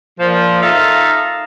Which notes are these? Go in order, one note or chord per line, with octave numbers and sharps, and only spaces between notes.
A#2 F3
D#4 F4 A4 E5 F5